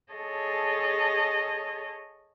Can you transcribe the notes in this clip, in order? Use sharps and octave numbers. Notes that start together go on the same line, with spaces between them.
G#4 A4 C#5 D#5 A5